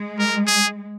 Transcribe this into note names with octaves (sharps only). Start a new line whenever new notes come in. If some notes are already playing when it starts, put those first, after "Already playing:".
Already playing: G#3
A#4
G#4